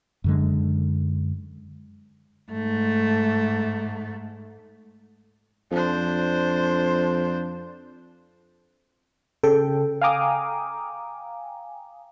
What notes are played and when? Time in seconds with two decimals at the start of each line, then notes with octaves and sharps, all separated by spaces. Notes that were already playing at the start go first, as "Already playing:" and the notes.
0.24 F#2 D3 G#3
2.52 G#2 A3
5.71 F2 D4 C5
9.43 C#3 A4 G5
10.01 F5 G5 G#5 A#5 D6 D#6